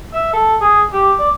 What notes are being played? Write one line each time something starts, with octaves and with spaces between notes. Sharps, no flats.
E5
A4
G#4
G4
D5